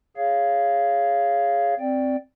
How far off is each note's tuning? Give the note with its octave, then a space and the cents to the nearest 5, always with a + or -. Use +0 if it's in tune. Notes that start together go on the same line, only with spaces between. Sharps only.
G#4 +0 C#5 +10 F5 -10
C4 +0 D5 +0 G5 +0